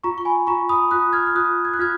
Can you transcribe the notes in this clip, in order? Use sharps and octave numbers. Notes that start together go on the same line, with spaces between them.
F4 A#5 C#6
C#6
G#5 B5
F4 A#5 C#6
B5 D#6
F4 D#6 F#6
F6 G#6
F6
F4 D#6 F#6
G#6
F#6
F4 F6 G#6